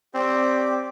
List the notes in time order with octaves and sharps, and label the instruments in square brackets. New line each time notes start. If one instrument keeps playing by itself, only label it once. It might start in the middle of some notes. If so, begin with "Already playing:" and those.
[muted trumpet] C4 [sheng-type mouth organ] G4 D5